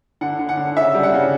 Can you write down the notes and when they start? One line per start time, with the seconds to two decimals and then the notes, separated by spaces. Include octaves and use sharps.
0.21 D3 F#5
0.39 D3
0.49 F#5
0.57 D3
0.77 C#3 E5
0.94 G3
1.03 F#5
1.14 C#3